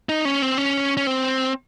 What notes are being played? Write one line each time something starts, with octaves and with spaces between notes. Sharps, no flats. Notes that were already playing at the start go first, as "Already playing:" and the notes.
D#4
C#4
C4
C#4
C#4
C4